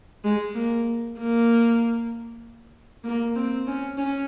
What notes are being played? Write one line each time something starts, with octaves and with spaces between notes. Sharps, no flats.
G#3
A#3
A#3
A#3
C4
C#4
C#4